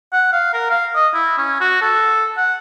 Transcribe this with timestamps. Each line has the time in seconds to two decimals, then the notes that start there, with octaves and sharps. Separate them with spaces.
0.13 F#5
0.33 F5
0.54 A#4
0.70 F5
0.96 D#5
1.14 E4
1.38 C#4
1.61 F#4
1.82 A4
2.37 F#5